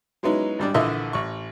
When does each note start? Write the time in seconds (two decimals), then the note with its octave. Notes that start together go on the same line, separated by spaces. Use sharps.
0.23 F#3 G#3 B3 C#4 D#4 E4
0.59 G#1 G3 D4
0.74 A#1 D3 E3 F4 D#5 E5
1.13 A1 C#6